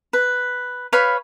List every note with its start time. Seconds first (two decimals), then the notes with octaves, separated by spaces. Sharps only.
0.13 B4
0.93 B4 C#5 F5 B5